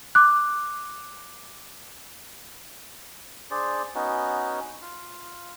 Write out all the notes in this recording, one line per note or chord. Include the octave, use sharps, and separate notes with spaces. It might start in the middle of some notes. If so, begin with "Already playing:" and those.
D6 F#6
D4 G#4 C5 D5
B3 C#4 D#4 F#4
F4 F5